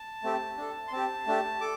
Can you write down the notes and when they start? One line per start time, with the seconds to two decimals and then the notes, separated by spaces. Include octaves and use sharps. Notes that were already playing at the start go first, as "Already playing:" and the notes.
Already playing: A5
0.23 A3 C4 G4
0.58 D4 A4
0.88 C6
0.92 C4 G4 A5
1.27 A3 D4 G4
1.61 A4 D6